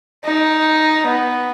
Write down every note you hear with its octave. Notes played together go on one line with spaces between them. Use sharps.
D#4
B3